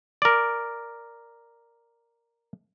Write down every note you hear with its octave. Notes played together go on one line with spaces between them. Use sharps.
A#4 D5